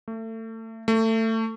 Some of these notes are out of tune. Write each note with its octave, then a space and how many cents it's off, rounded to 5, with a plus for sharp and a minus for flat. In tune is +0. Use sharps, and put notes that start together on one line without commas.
A3 +30
A3 +25